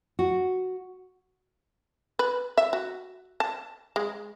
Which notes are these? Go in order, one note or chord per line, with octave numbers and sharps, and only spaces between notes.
F#4
B4
E5
F#4
A5
G#3